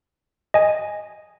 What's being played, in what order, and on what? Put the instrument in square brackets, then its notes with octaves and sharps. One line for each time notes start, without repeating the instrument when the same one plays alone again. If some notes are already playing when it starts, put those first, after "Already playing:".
[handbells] D#5 G#5